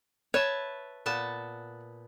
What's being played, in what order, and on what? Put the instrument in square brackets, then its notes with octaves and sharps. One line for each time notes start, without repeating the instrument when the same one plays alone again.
[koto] B4 E5 A5 [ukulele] C#5
[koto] A#2 B3 A5